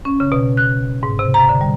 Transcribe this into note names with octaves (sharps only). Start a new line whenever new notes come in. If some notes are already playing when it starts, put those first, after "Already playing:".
C#4
C#3
B2
F#6
G#2
C3
A#5
D3
G3